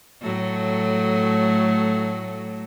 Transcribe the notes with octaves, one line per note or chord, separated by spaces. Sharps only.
A2 F#3 A3